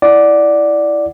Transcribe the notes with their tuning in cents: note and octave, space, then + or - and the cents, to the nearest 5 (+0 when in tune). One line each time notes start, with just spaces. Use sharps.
E4 +5 D5 +0 F#5 +0